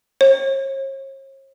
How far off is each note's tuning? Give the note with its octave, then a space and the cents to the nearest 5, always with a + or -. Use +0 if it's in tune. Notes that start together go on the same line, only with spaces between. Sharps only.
C#5 -45